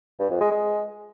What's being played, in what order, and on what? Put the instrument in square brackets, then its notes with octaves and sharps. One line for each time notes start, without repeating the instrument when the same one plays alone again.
[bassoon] G2
F2
G#3
G#3